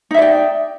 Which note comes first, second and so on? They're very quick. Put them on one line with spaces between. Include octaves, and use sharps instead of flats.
D#4 E5 D5 G5